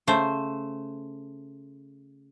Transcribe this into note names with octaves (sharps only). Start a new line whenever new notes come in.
C#3 A3 C5